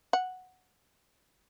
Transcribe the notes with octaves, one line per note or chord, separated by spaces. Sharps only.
F#5